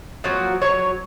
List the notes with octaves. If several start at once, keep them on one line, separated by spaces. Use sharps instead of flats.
F3 F#3 A#3 F#4
F#3 C#5